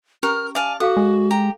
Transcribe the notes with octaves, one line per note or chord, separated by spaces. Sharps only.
C#4 G4 A#4 F6
D5 E5 F5 G#5 A5
F#4 A4 F5 F#5 D6
G#3
G4 A#5